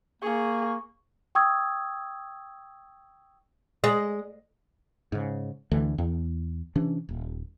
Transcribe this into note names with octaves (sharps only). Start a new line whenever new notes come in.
A#3 G#4 C#6
G5 C#6 D#6 E6 G#6
G#3
G#2 C#3
D2 D3 E3 A3
E2
C3 E3 C#4 D4
D#1